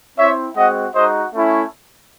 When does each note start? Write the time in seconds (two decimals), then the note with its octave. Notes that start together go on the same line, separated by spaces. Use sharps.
0.18 C4 E4 C#5 E5
0.55 G#3 C4 F#4 D#5 F#5
0.94 G#3 D#4 F#4 C5 D#5
1.32 A3 C#4 E4